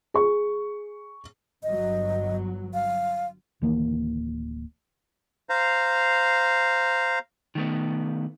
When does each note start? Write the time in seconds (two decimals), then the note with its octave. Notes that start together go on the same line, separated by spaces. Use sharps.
0.14 G#4 C#6
1.63 G1 G2 F#3 D#5
2.74 F5
3.62 D1 D#3 E3 A#3
5.49 C5 F5 A#5
7.55 D#3 A3 B3